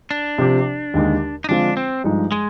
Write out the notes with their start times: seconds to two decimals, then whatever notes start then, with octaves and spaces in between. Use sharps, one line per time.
0.11 D4
0.38 C3 F3 C4 G4
0.94 D#2 D3 G#3 D#4 G4
1.44 D#4
1.49 D3 F3 G#3 C4 D4 F4
1.77 C4
2.04 G2 F3 G#3 D#4
2.32 G#3